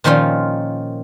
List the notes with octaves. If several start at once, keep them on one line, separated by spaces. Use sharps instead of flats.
A#2 D#3 F3 C#4 F4